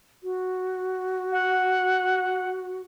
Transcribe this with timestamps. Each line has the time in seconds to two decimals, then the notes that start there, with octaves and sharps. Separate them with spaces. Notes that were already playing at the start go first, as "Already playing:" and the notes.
0.23 F#4
1.32 F#5